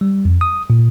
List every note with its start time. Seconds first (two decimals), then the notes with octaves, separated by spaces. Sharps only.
0.01 G3
0.25 F2
0.41 D#6
0.70 A#2